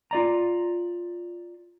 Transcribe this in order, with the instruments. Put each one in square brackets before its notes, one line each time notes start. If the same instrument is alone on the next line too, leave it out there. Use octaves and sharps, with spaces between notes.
[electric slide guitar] F4 D5 A#5